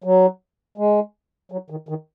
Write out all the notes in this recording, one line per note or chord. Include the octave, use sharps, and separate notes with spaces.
F#3
G#3
F#3
D#3
D#3